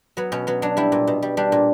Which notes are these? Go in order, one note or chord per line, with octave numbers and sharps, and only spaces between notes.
F#3 B3
B2 C#4
F#3 B3
F#3 D4
G3 E4
A#2
B2
G3
G3 D4
A#2